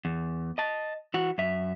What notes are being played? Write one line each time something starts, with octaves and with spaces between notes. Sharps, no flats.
E2
D#5 A5
E3 F#4
F#2 E5